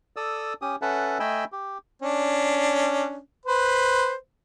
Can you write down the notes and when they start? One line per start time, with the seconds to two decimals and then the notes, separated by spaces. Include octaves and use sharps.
0.16 A4 D5 D#6 E6
0.62 C#4 G4 D#6
0.82 C#4 A4 B4 E5 F#5 A5
1.20 A3 D#5 G5 G#5 B5 E6
1.52 G4
2.02 C#4 D4
3.46 B4 C5